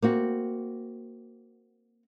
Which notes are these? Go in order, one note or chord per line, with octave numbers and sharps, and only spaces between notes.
A#3 C4 F#4